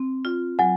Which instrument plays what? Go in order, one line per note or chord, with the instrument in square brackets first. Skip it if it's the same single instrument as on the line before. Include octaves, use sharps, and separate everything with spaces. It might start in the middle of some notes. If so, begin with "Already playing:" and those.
Already playing: [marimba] C4
F4
[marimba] F#3 [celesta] F#5 G#5